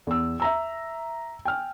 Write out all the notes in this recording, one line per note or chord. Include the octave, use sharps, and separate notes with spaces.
E2 E6
E5 A#5 E6
G5 G#5 F6